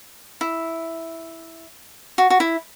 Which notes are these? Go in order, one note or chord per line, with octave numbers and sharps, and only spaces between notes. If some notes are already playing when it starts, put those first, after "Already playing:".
E4
F#4
F#4
E4